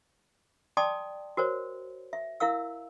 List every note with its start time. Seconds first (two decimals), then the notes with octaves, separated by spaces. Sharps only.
0.77 D5 G5 A5 C6 D6 D#6
1.37 F#4 A#4 C5 C#5
2.13 E5
2.40 E4 A#4 F5 E6